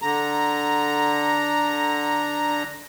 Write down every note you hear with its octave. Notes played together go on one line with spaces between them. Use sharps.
D3 A#5